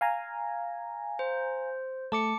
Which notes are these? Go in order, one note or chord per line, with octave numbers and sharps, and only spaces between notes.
F5 G#5 A#5
C5
A3 A5 D6 C#7